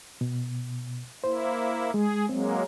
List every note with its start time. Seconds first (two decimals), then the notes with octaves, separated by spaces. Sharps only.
0.21 B2
1.24 A#3 E4 C5
1.94 G#3 G#4
2.29 F#3 G#3 A#3 C4